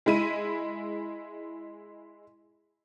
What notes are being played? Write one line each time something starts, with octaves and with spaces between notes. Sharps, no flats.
G#3 E4 D#7